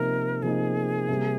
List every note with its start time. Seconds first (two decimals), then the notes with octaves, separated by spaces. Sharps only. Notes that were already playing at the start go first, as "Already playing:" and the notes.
Already playing: C3 F3 A#3 D#4 A#4
0.42 C3 F3 A#3 D#4 G#4
1.08 C3 G3 A#3